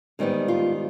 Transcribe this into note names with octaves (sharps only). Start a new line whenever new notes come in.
G#2 D#3 G3 B3
F4